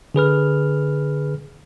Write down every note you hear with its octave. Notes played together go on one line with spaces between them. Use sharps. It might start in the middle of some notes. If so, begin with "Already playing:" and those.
D3 G#4 B4 F6